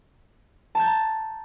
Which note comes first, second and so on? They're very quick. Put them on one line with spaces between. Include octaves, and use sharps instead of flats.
A5 G6 A#5